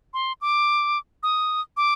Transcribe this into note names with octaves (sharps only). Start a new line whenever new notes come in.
C6
D6
D#6
D6